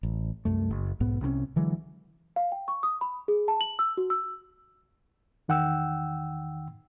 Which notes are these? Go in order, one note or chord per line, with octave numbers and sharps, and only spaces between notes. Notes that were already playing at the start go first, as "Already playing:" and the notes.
A1
C2 F#2 A3
F#1
B1 G#2 B3
C2 C3 G#3 C#4
D3 E3 F#3 G#3
F5
G5
C#6
D#6
B5
G#4
A5
F#7
E6
F#4
E6
E2 D#3 F#5 G5 E6